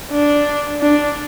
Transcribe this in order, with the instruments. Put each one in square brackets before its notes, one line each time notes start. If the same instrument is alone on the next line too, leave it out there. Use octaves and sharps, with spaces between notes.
[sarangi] D4
D4